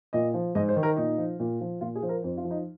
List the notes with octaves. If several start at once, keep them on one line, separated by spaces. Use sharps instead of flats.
A#2 D#5
F3
G#2 D#5
C5
D#3
A#4
A#2 D#4
F3
A#2
F3
A#2 F4
G#4
F3 C5
A#4
F2 C5
F4
F3
D#4